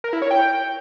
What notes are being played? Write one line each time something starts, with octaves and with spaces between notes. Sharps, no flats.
A#4
E4
C#5
G5